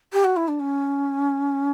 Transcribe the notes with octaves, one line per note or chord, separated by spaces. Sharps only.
G4
F#4
E4
D4
C#4